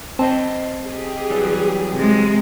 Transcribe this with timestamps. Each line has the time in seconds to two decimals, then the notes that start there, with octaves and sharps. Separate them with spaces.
0.19 C4 C5 D#5 A5
0.81 G4 G#4
1.30 E3 F#3 G3
1.94 C3 G#3